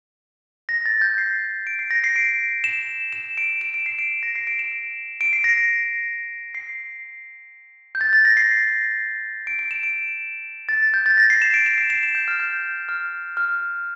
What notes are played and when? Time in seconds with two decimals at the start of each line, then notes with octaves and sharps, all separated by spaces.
0.69 A#6
0.86 A6
1.01 G6
1.18 C7
1.67 D7
1.79 C7
1.91 A#6
2.04 C7
2.16 D7
2.64 E7
3.13 E7
3.38 D7
3.61 E7
3.74 D7
3.86 C7
3.99 D7
4.23 A#6
4.35 C7
4.47 D7
4.59 E7
5.21 D7
5.33 C7
5.44 A#6
6.55 C7
7.95 G6
8.01 A6
8.13 A6
8.25 A#6
8.37 C7
9.47 D7
9.59 D7
9.71 E7
9.83 D7
10.69 A6
10.94 G6
11.06 A6
11.17 A#6
11.30 C7
11.42 E7
11.54 D7
11.66 E7
11.78 C7
11.90 E7
12.03 E7
12.15 G6
12.28 F6
12.40 G6
12.89 F6
13.37 F6